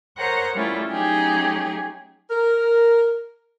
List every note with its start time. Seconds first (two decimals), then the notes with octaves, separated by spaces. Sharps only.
0.18 A#4 C5 C#5 F#5 A#5 D#6
0.55 G3 A3 C#4 E4 F4
0.90 F#3 A3 C#4 D#4 G4 G#4
2.31 A#4